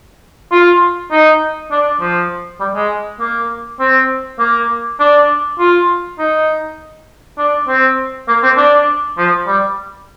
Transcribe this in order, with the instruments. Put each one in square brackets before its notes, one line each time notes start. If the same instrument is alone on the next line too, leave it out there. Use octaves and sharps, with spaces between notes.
[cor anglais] F4
D#4
D4
F3
G3
G#3
A#3
C4
A#3
D4
F4
D#4
D4
C4
A#3
C4
D4
F3
G3